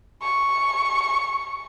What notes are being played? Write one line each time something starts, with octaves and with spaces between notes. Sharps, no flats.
C#6